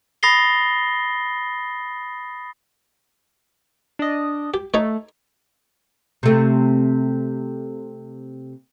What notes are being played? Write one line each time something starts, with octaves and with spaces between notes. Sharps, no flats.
B5 D#6 A6 A#6 C7 G7
D4 D#5
G4
A3 D#4 A4 C#5
C3 A3